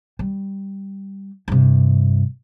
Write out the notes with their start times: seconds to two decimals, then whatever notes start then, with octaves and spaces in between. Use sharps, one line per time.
0.19 G3
1.48 G2 C3